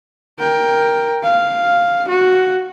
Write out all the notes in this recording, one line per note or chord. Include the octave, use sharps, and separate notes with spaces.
A#4 G5
F5
F#4